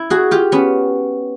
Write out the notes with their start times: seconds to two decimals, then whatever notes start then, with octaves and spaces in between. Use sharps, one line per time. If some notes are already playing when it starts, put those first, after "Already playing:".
Already playing: E4
0.10 F#4 G#4
0.31 F4 G4
0.52 B3 C#4